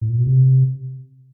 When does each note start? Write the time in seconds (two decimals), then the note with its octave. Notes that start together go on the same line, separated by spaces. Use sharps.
0.01 A2
0.09 A#2
0.18 B2
0.27 C3